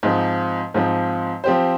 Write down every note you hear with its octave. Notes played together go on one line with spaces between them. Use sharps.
G#2 F3 C4
G#2 F3 C4
F3 C4 G4 C5